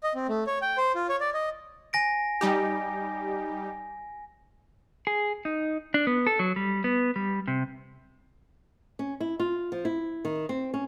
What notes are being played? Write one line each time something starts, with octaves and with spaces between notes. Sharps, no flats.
D#5
C4
A3
C#5
G5
C5
F4
C#5
D5
D#5
G#5 A#6 D7
G3 D#4 G4
G#4
D#4
D4
B3
A4
F#3
G3
B3
G3
C3
C#4
E4
F4
F3
E4
D#3
C4
C#4